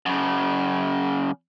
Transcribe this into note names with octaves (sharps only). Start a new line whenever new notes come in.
F#2 C#3